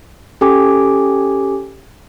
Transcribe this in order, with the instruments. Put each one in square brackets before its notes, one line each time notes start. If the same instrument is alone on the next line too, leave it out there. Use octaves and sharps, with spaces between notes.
[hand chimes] C#4 G4 A4 G#5 D6